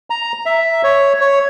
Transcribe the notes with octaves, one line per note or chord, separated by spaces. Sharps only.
A#5
E5
C#5
C#5